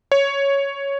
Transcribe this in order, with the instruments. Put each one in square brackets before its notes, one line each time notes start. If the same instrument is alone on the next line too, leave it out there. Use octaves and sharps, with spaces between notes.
[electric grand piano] C#5